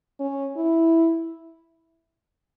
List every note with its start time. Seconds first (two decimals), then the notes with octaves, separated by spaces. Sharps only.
0.20 C#4
0.57 E4